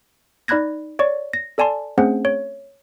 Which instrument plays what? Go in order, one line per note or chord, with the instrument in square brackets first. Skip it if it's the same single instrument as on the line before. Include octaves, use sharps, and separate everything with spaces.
[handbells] D#4 D5 B5 F#6 G#6 A#6
C#5 D5 C#6
A#6
A4 D5 G#5 A5 C6
A3 C4 C#4 G#4 C5 F#5
C#5